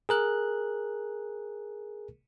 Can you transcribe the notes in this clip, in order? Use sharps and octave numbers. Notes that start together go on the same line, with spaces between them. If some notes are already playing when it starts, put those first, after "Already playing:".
G#4 A#4 F#6